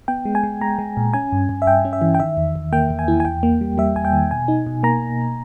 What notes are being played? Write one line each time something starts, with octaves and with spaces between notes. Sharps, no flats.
B3 G5
G#3
G#5
G#3
G#3 A#5
G#3
A#2
C#4 G#5
G2
G2
E5
G2 G5
C#4
E5
E3
G5
D#3 E5
E2
E2
A#3 G5
E2
G#5
E4
G#5
E2 G5
A#3
G3
G3 E5
E2 G#5
G5
D#3
B2 G#5
D#4
B2
A#3 A#5